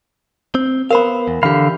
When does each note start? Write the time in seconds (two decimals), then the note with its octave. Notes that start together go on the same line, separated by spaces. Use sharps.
0.55 C4
0.91 B3 A#4 C5 F5 B5
1.28 E2
1.43 D3 E3 G4 F5 B5